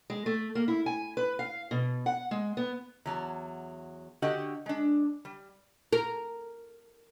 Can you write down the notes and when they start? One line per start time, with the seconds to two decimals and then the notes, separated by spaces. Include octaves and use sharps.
0.10 G#3
0.26 A3
0.55 A#3
0.68 E4
0.86 G#5
1.17 B4
1.39 F5
1.71 B2
2.06 F#5
2.31 G#3
2.57 B3
3.06 E2 F#3 A5
4.22 D3 F#4 G4 D#5 F#5 G5
4.66 G#3 D4
5.25 G3
5.93 A#4